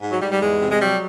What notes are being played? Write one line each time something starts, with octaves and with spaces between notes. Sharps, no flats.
G#2
F#3
G#2 G3
G3
E2 G#3
C3
G#3
F#3 G3